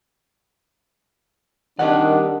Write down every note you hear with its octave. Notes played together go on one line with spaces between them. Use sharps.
D#3 D4 G4 A#4 D5 F#5